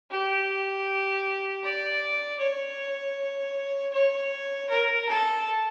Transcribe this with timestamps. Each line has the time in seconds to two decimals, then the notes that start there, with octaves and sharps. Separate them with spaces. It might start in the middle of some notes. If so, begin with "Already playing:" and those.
0.10 G4
1.63 D5
2.39 C#5
3.93 C#5
4.69 A#4
5.08 A4